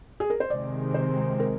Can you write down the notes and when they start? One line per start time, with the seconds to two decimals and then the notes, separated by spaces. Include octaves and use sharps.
0.20 G#4
0.30 A#4
0.40 C5
0.50 C3 D#3 G#3 C4 D5
0.94 C5
1.40 A#4